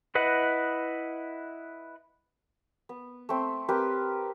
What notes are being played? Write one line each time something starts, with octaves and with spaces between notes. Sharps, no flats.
E4 B4 D#5 F#5
B3
A3 C4
C4 G4 A#4 B4